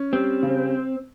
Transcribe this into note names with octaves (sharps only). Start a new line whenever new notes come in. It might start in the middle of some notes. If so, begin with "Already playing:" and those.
Already playing: C#4
G3 C4
C#3